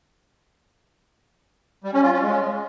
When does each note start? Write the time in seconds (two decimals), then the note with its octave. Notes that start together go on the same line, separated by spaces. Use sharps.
1.84 G3
1.94 C#4
2.03 F4
2.13 C#4
2.22 G#3